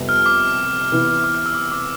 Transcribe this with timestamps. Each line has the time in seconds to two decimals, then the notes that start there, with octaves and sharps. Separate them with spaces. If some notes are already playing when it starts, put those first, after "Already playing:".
Already playing: F2 C3 G3 B3
0.09 F6
0.26 D6
0.92 C3 E3 B3 E4
1.24 D6
1.35 F6
1.46 E6
1.55 D6
1.72 D6